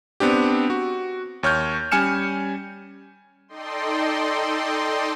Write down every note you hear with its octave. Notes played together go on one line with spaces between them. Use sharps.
B3 C4 D4 G4
F#4
D#2 C#5 F6 G6
G3 C#4 G#5 F6 C#7 E7
D#4 A4 D5 D#5 G5 C6